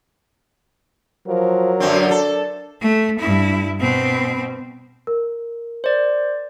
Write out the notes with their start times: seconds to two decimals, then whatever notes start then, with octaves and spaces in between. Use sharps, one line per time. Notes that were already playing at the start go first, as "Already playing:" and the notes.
1.28 F3 F#3 A#4
1.80 F#2 D3 C4 D4
2.11 A4
2.82 A3
3.19 G2 E4
3.80 B2 C4
5.07 A#4
5.84 C5 D5